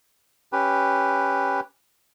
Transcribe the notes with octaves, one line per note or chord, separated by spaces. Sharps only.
C#4 G4 B4